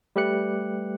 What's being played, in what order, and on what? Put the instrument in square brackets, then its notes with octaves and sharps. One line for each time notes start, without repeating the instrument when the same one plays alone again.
[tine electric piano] G3 A3 G4 B4 F#6 C#7